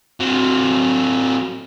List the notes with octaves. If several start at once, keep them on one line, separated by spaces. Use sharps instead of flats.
F#3 C4